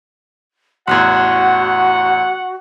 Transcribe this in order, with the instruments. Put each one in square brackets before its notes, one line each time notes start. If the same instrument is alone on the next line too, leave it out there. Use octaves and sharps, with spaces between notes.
[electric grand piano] A1 E2 [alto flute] F#4 [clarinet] F#5 [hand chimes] C6 F#6 G#6